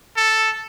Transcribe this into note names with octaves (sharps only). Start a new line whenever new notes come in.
A4